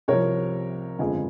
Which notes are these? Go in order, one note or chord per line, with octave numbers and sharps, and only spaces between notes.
C2 C3 F3 A#4 C#5
G1 F2 C#3 F3 G#3 F4 G#4